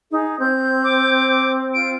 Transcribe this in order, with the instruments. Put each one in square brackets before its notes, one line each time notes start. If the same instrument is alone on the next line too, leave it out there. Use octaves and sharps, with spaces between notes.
[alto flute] D#4 [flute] G#4
[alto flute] C4 [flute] G6
[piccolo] D6
[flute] F4 [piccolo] D7